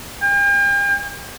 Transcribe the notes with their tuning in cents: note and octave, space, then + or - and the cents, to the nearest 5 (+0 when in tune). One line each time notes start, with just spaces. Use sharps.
G5 +45